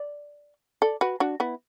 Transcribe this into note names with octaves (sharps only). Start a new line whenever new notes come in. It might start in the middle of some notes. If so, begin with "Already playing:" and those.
Already playing: D5
A4 D5
F#4 B4
D4 F#4
B3 E4